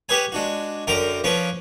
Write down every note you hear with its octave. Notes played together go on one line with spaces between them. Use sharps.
G4 G#4 B4 C#5 G#5
G#3 D4 F#4
F#2 D3 A#4 G5 A#5 D6
F3 C#4 B4 C#6 D6